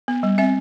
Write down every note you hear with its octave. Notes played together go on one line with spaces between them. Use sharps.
B3
G3
C4 E5